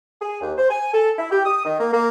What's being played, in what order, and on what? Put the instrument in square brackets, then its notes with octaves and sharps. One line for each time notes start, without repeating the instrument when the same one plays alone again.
[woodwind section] G#4
D#2
C5
G#5
A4
E4
G4
D#6
D#3
A#3
A#3